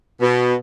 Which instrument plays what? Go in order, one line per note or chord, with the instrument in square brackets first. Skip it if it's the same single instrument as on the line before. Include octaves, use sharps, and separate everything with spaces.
[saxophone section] B2